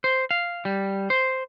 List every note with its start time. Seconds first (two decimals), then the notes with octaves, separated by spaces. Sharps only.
0.04 C5
0.31 F5
0.65 G3
1.10 C5